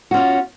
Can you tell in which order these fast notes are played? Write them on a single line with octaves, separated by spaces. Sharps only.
F#4 C#4 F4